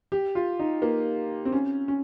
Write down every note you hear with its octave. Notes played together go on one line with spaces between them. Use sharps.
G4
F4
D#4
A#3
C4
C#4
C#4